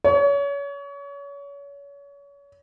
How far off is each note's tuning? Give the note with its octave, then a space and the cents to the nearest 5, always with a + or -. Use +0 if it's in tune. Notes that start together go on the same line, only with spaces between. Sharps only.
C#5 +30